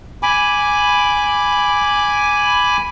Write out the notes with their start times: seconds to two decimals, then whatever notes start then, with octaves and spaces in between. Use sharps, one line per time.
0.23 G#5 B5 D6